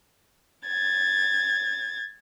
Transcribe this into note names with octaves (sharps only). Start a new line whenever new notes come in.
G#6 A6